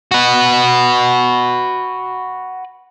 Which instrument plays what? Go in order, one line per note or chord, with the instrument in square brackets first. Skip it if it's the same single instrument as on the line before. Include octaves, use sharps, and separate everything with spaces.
[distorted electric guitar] F#4 B4